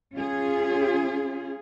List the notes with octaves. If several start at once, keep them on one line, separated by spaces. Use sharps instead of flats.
C#4 F4 G#4